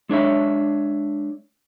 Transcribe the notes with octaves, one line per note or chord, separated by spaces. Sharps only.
G#3 D4 C#5 E5